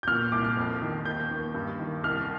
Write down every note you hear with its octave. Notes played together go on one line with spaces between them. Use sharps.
G6
A#2 F6
C2 D6
F6
F2
D#3
D#2 G6
D#2
G2
D#3
C2 F6